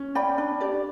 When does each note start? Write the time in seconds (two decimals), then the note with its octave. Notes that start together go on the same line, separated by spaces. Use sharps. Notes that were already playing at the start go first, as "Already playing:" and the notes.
Already playing: C#4
0.15 D5 G5 B5
0.38 D4
0.60 G4 D5